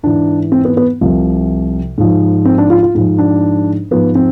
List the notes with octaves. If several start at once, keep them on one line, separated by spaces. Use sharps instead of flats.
G#2 E3 D4
C4
B3
B3
C2 C3 F3
G#2 F3
C4
D4
F4
F4
G#2 F3
D4
G#2 F3 B3
C4